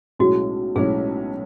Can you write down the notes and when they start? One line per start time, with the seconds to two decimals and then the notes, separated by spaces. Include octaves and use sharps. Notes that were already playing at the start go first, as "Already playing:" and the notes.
0.19 B1 A2 G#3 C#4 F#4
0.76 B1 A2 G#3 C#4 G#4